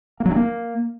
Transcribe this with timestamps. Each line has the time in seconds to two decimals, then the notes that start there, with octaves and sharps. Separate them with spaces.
0.20 A#3
0.26 F#3
0.31 D4
0.36 A#3